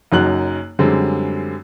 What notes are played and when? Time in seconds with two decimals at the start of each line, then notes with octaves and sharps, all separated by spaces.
0.12 F#1 F#2 D#4 F#4 F#6 F#7
0.79 F#2 D3 G3 G#3 C4